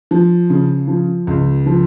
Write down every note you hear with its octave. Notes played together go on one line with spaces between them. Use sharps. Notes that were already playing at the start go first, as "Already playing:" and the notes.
F3
C#3
F3
C#2
F3